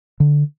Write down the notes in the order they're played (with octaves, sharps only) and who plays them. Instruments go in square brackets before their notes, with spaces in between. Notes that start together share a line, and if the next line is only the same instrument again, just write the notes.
[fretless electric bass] D3